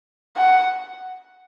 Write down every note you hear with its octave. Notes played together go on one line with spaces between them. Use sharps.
F#5